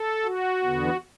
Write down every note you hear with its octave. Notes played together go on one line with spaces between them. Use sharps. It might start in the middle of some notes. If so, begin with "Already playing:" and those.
Already playing: A4
F#4
E2 D3 B3